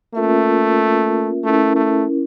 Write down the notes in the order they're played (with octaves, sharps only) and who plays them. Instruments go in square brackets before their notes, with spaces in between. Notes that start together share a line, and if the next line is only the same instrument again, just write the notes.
[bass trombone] A3 [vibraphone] A#3 C#4 F4 A#4 E5
[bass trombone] A3 [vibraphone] C#4 E4 A#4
[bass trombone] A3